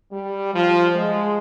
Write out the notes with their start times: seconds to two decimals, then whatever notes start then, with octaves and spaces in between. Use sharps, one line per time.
0.11 G3
0.54 F3
0.96 G#3